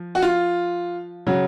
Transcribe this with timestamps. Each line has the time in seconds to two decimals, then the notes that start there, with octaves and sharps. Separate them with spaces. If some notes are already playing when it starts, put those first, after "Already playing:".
Already playing: F3
0.15 F#4
0.22 F4
1.27 C#3 F#3